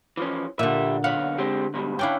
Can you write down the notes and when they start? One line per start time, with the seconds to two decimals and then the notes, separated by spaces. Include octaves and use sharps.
0.17 E3 F3 C#4
0.59 A#2 D3 G3 E5
1.04 B1 C#5 F5 F#5 B5
1.38 G#3 C4 G4
1.74 G#2 B2 G3
1.99 C#4 D4 E4 F5 G5